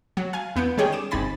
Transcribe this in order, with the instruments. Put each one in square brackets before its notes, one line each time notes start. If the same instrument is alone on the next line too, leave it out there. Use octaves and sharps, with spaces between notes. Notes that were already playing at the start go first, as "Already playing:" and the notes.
[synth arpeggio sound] F#3
F5 G#5
E2 B3 G6 D7
D#3 G3 C#4 G#4 C#5 G5
D6 E7
G1 C3 D#4 G#5 B5 A6